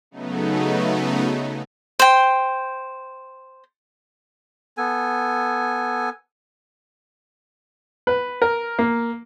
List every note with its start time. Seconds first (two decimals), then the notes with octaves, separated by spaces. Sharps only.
0.11 C#3 F#3 A3 B3 D#4
1.99 C5 G5
4.77 B3 A4 G#5
8.07 B4
8.42 A#4
8.79 A#3